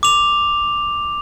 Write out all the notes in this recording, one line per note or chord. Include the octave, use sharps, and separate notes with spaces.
D6 F7